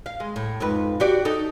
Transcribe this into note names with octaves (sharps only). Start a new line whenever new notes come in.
F5
G#3
A2
F2 G#2 B4
F#4 G4 D5
D#4 A4